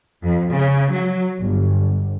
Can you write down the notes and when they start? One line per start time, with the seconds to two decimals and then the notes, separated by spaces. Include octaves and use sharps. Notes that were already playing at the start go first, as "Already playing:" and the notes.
0.23 F2
0.53 C#3
0.92 F#3
1.39 G1